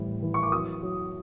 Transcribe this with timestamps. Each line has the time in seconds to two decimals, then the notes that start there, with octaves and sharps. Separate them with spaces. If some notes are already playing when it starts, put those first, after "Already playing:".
Already playing: A2 E3 G3
0.22 E3
0.34 C#6
0.43 D6
0.52 F#3 D#6
0.83 F#3